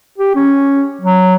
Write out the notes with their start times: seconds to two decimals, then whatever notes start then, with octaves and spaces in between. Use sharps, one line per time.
0.18 G4
0.35 C#4
1.01 F#3